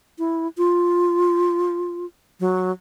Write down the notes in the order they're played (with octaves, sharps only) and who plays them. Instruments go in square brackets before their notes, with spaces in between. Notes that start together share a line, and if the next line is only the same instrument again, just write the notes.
[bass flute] E4
F4
F#3